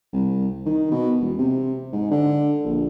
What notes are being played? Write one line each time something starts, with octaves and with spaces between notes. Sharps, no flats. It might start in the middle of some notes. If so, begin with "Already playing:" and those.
C2
D#3
B2
E1
C3
G#2
D3
A#1